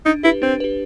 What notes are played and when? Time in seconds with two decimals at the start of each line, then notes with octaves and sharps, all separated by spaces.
0.06 D4 D#4
0.23 E4 G4 B4
0.42 C4 D4
0.60 G4 B4